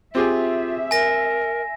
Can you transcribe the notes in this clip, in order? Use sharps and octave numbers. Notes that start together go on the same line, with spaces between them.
C4 F4 G4 G#4 E5
A#4 G#5 A#6